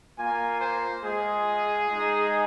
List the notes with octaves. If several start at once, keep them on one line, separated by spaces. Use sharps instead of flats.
A#3 F4 G#5
C5
G#3 F4 G#4
G#3 D#4